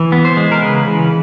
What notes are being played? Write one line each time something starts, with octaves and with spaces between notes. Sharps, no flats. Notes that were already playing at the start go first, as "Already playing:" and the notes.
Already playing: E3
B3
C5
G#3
A#4
C#3 B4
E3